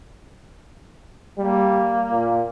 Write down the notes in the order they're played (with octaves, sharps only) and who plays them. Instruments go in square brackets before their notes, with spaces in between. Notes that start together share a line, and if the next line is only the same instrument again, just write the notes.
[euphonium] G3 [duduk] A#3
[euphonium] A#2